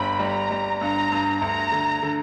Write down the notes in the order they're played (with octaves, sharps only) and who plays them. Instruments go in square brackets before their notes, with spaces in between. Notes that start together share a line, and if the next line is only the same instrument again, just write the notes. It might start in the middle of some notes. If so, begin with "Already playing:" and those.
Already playing: [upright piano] G1 G3 [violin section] B5
[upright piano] G3 [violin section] A#5
[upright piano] G3
[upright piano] G2 [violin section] A#5
[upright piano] G2
[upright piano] D2 [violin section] A#5
[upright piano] D3
D3